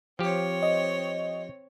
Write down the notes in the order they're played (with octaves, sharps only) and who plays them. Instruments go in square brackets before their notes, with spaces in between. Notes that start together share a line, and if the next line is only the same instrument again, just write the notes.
[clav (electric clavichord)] F3 G4 [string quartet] C4 C#5
[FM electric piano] D#5